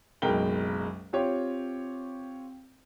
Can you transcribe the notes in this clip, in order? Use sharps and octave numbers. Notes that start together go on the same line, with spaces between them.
F#1 B1 G#3 A#4 G5 G7
C4 F4 G4 C#5